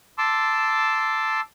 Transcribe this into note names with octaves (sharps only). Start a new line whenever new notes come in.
A5 C6 D6 E6